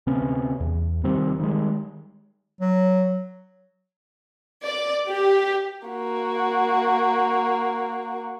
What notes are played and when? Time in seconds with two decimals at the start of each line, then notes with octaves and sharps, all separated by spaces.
0.07 D2 C3 B3 C#4
0.60 E2
1.04 C3 D#3 G3 C4
1.40 D#3 G3 G#3
2.61 F#3
4.65 D5
5.09 G4
5.87 A#3 F#4